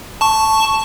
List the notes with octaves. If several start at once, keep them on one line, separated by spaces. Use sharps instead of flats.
A5 C#6